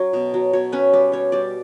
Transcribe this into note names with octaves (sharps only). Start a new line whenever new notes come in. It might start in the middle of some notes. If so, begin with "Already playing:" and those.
Already playing: F#3 C#4 C#5
B2
F#3
B2 C#5
C#4 B4
G3 B4
G3 C#5
G3 D5